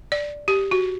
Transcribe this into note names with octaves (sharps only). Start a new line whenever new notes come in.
D5
G4
F#4